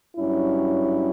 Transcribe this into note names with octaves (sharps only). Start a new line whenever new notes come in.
G2 F#3 C#4 E4